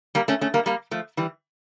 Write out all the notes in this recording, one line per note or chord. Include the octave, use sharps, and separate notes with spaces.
G3 A#3
A3 C#4
A3 C#4
G3 A#3
G3 A#3
F3 A3
E3 G3